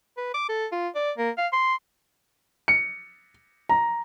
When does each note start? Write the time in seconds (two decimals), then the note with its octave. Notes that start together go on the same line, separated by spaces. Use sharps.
0.17 B4
0.34 D6
0.49 A4
0.72 F4
0.96 D5
1.18 A#3
1.38 F5
1.53 C6
2.68 C#7
3.69 A#5